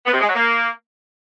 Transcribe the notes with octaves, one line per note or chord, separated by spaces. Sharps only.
B3
C3
G#3
F#3
A#3